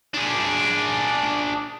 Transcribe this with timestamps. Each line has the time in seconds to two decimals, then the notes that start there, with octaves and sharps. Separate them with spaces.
0.14 D4 G#4